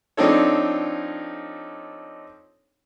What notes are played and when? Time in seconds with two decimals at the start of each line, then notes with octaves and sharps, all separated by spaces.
0.17 F3 C4 D4 D#4 A4 C#5